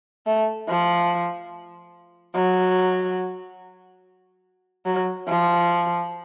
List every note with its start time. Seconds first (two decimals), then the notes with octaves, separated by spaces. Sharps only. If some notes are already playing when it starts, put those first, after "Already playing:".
0.27 A3
0.69 F3
2.36 F#3
4.86 F#3
5.28 F3